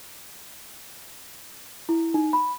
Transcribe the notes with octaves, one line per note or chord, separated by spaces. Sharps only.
E4
D#4
B5